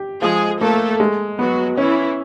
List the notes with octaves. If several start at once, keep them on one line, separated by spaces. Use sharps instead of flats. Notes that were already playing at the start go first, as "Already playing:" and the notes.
Already playing: G4
F3 G#3 G#4
A3 A#3 A4
G#3
F#3 B3 F#4
E3 C#4 E4